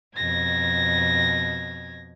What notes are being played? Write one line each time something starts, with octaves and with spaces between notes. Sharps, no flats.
F2 B2 G#6 A#6